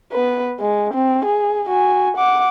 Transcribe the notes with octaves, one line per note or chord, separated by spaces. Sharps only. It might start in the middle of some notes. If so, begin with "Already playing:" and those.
B3 B4
G#3
C4
G#4
F#4 G#5
F#5 D6